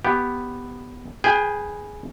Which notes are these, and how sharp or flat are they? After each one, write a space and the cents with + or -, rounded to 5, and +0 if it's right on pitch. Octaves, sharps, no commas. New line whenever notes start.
B3 +0 G4 +0
G#4 +0 B4 -5 G5 +35